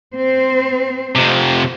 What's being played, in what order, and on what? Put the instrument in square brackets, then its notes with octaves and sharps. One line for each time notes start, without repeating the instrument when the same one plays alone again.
[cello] C4 C5
[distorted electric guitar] F2 C3